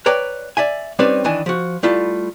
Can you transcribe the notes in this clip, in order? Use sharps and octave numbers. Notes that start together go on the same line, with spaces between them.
B4 C#5 D5 G5 A#5
D5 E5 G#5
G3 C4 C#4 D#4 B4 D5
D#3 E3 D4 G#5
F3 F#4
G3 A3 E4 F4